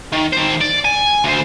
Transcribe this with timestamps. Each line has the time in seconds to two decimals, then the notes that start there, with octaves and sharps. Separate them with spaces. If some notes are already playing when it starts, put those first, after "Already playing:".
0.13 D#3
0.33 D#3 C5
0.61 D5
0.85 G#5
1.24 D2 C5